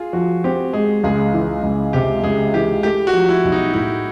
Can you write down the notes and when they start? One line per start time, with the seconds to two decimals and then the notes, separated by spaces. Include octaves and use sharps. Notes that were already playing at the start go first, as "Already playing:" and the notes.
Already playing: F4 G#4
0.13 F3 F#4
0.44 C4 G4
0.73 G#3 G#4
1.03 C#2 G#4
1.34 E3
1.63 C#2
1.93 C3 G4
2.23 C#2 G#4
2.54 E3 G4
2.83 A3 G4
3.07 F#4
3.13 F3
3.29 E4
3.45 B1
3.52 D#4
3.73 A2 E4